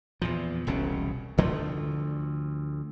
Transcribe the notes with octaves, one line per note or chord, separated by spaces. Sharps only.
E2 A#2 F3
E1 C2 C#3 C#4
D2 D3 F3 A3